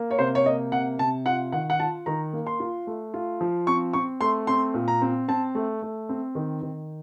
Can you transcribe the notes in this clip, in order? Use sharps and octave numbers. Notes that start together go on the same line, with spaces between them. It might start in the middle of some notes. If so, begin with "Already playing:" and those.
Already playing: A#3
C#5
C3 C5
C#5
A#3 D#5
C3 F#5
C3 A5
F4 F#5
D#3 F#5
F#5
F4 A5
D#3 A#5
A#3
C6
F4
A3
F4
F3
C4 C#6
C4 C#6
A3 C6
C4 C6
A#2
A#5
C4
C4 A5
A3
A3
C4
D#3
D#3